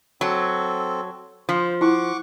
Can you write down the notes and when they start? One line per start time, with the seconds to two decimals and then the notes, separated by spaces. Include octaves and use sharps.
0.21 F#3 C4 A4
1.49 F3 C5
1.81 E4 F#5 C#6 D6